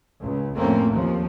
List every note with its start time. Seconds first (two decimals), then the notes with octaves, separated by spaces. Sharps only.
0.19 C#2
0.55 F2 A2 A3 A#3 C4 C#4
0.90 D#2 F3